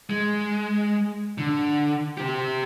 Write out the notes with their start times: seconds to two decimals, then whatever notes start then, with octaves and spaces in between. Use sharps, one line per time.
0.10 G#3
1.38 D3
2.18 G4 C5